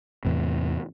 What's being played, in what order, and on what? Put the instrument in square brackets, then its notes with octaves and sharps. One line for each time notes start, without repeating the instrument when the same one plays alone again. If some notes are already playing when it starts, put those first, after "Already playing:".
[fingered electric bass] E2 A2 C3